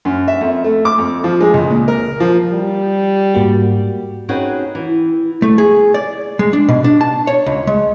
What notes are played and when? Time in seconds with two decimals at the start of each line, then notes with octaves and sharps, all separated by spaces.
0.05 F#2
0.28 E5
0.41 F2
0.64 A3
0.85 D6
0.98 F2
1.24 F3
1.41 G#3
1.54 C#2
1.70 A#2
1.88 A#4
2.20 F3
2.53 G3
3.34 G#2 A#3 F#4
4.29 C4 C#4 D#4 F#4 G#4 B4
4.75 E3
5.42 A3
5.58 G#4
5.94 D5
6.39 G#3
6.53 D4
6.69 B2
6.84 D4
7.01 A5
7.27 C#5
7.46 C#2
7.67 G#3